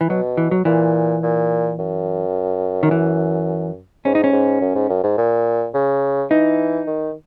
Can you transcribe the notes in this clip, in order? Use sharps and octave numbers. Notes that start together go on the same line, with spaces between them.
E3
B2 F#3
E3
F#3
A#2 E3
A#2
F#2
D#3
E3
G#2 C#4
D#4
C#4
G#2
F#2
G#2
F#2
G#2
A#2
C#3
E3 D#4
D#3